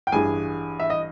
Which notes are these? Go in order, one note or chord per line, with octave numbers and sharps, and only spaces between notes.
G5
A1 G2 E3 G#4 G#5
E5
D#5